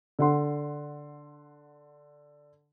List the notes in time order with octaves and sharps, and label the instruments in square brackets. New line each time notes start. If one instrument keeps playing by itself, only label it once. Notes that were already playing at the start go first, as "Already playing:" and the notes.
[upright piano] D3 F#5 C6